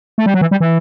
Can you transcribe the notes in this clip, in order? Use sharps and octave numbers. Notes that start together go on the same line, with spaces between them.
A3
G3
F#3
E3
G3
E3